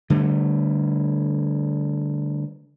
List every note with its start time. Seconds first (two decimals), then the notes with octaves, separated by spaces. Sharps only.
0.10 D3 G3 A3